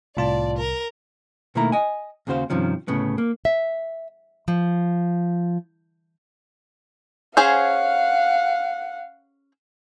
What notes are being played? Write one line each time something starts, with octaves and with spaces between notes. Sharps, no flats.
C2 A2 F4 D5 A5
A#4
B2 D#3 A3 A#3 E4 A#5
D#5 G#5
D#2 C#3 F#4 C5 F5
G2 C3 D#3 F3 C#4
D2 A2 C#3 B3
A#3
E5
F3
C#4 G#4 C5 F5 F#5